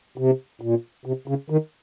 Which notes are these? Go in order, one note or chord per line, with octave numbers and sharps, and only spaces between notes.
C3
A#2
C3
C#3
D#3